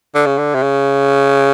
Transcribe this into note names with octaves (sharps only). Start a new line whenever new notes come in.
D3
C#3
D3
C3
C#3